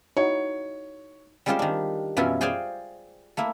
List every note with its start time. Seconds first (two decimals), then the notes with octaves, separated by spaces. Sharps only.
0.17 D#4 E4 F#4 C#5
1.46 G3 G#3 C#4 F4 G4 C5
1.59 D#3 D4
2.17 F#2 B2 E3 C#4 E4 F4
2.41 G#4 C5 D5 F5 G5 G#5
3.37 A3 A#3 E4